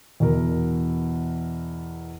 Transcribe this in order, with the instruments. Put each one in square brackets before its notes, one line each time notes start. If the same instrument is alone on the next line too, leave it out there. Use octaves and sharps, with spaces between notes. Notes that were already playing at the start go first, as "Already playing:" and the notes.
[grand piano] E2 B2 A#4